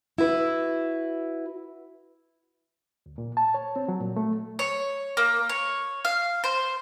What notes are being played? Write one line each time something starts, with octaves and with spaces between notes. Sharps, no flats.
E4 F#4 B4
D2
A#2
A5
C#5
C4
F#3
A#2
A3
C#5
A#3
C#5
F5
C5